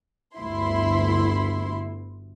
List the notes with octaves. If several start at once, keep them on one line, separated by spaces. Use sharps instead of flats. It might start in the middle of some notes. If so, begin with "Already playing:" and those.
G1 D2 E4 C6